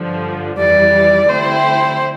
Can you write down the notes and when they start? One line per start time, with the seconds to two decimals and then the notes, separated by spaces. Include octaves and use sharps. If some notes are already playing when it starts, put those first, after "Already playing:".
Already playing: G2 D3 F3
0.58 F2 E3 G3 D5
1.28 D3 A3 C4 E4 G4 C5